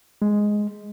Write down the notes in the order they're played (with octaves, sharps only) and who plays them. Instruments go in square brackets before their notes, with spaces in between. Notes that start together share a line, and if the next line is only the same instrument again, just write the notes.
[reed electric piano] G#3